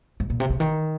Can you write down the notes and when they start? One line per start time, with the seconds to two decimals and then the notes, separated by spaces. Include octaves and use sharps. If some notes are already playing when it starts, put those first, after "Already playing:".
0.20 G#2
0.30 A#2
0.40 C3
0.50 C#3
0.60 D#3